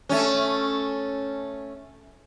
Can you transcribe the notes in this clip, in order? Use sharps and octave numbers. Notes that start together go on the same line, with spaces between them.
A3 C#4